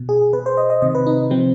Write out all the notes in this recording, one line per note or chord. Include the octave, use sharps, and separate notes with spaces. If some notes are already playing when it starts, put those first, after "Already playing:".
Already playing: B2
G#4
B2 B4
C5
D#5
D#5
C3 D#3 D#5
B4
D#4
C3 F3 C4